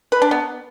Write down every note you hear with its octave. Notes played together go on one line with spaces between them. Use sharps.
B4
D4
B3